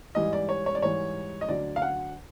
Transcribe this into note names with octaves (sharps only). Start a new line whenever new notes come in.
G#2 E3 G3 D#5
D5
C#5
C#5
D5
G#2 E3 G3 C#5
D#5
D2 D3 F#3 D5
F5
F#5